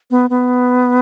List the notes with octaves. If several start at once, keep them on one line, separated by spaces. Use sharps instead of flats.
B3
B3